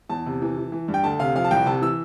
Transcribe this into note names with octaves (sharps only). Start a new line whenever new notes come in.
E2 A5
C3
E3
E3
E3
G2
G5
D2 A5
C3 F5
F3 F5
A5
C2 G5
C3 A5
E3 E6